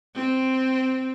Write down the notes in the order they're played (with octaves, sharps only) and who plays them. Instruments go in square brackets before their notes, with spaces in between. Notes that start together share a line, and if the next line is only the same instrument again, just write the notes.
[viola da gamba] C4